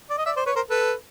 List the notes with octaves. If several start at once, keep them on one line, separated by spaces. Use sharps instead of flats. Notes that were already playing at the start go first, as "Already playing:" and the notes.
D5
D#5
D5 E5
C5 D5
B4 C#5
A#4 C5
A4 B4